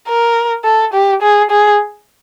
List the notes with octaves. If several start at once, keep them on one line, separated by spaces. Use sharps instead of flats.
A#4
A4
G4
G#4
G#4